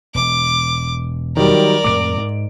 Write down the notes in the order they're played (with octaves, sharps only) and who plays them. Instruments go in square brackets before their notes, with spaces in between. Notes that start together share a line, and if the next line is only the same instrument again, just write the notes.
[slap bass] E1 [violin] D6
[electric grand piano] D#3 F#3 G3 [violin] A#4 D5
[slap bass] F2 A2 G#3 [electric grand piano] D6 D7
[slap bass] G#2